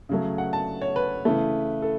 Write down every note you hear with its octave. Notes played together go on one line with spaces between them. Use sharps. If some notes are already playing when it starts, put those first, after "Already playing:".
C#3 F#3 A3
F#5
A5
C#5
B4
C#3 E3 A3
A4